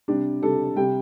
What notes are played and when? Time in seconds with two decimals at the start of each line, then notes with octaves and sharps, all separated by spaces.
0.08 C3 G3 D4 G4
0.42 C3 G3 D4 A4
0.76 C3 G3 G5